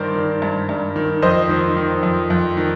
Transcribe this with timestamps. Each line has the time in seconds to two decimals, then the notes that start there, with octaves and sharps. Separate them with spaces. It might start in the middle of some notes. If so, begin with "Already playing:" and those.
Already playing: G2 D#3 A#4 C5 D5
0.15 D#3
0.42 G2
0.69 G2
0.96 D#3
1.22 F2 C5 D#5
1.49 D#3
1.76 D#3
2.03 F2
2.30 F2
2.57 D#3